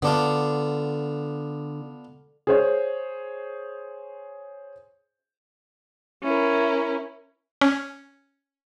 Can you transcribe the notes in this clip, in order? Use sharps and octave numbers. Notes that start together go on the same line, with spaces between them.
D3 B3 D4 F4
G#4 C5 C#5
C#4 E4 A#4
C#4